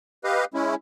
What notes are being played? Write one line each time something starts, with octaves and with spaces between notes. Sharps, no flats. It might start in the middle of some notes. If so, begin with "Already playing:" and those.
G4 B4 D#5 F5
G#3 C#4 E4